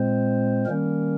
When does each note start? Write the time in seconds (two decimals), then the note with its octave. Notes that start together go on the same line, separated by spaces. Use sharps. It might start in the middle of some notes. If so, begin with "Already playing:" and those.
Already playing: A#2 G#3 C4 C5
0.66 D#3 G3 A#3 C#4 A#4